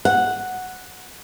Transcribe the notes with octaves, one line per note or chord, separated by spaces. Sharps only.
F#5